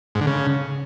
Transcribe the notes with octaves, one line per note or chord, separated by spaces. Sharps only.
G#2
D3
C#3